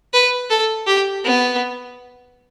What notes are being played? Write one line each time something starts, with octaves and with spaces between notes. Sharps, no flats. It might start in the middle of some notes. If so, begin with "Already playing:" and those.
B4
A4
G4
B3